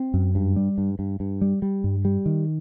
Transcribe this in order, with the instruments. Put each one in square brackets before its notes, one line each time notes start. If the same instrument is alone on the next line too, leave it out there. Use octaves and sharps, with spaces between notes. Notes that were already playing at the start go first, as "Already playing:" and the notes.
Already playing: [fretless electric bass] C4
F#2
G2
G3
G2
G2
G2
G3
G3
G2
G3
D#3